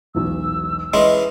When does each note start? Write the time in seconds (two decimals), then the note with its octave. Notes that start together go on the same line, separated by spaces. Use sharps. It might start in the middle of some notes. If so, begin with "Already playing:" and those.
0.15 E1 B1 E6
0.94 E3 G#3 C#4 D#5 C6